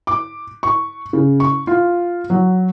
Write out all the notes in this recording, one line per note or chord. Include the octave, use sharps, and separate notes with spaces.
D6
C#6
C#3
C#6
F4
F#3